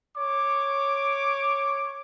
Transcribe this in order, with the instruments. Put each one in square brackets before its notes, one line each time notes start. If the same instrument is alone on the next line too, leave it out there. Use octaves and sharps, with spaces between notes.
[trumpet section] C#5 D6